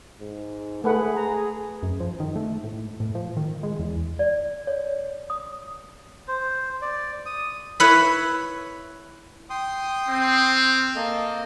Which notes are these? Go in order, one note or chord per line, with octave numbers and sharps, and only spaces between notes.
G#2
A3 G#4 B4 F#5
A#5
F#2
F3
D#3
A3
A2
A2
F3
D#3
G#3
E2
D5
C#5
D#6
C5
D5
D#6
E4 B4 C#5 E5 B5
G5 C6 D#6
C4
F6
A#3 A4 D#5